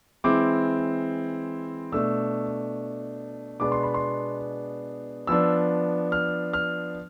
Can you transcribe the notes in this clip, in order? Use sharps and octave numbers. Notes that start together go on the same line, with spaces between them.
E3 G#3 C4 E4 D6
B2 A3 D4 E6
B2 G#3 B3 D4 D6
C6
B5
C6
F3 B3 D4 E6
F6
F6